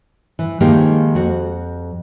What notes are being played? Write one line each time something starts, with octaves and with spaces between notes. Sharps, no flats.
E3
D#3 F3 G#3 A#3 D#4 G4
F2 F#4